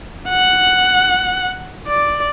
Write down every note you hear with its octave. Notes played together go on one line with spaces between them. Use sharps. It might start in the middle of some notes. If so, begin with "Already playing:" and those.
F#5
D5